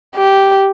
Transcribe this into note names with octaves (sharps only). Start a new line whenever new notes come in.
G4